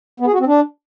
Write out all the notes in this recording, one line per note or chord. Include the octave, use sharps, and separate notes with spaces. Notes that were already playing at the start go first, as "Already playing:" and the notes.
B3
G#4
F#4
C4
D4